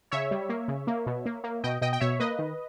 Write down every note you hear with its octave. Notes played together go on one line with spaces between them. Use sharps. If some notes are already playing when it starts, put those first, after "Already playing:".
C#3 C#5 E5
G3
A#3
C#3
A#3
B2
A#3
A#3
B2 D#5 G5
B2 D#5 G5
G5
B2 C#5 E5
A#3 B4 D#5
D#3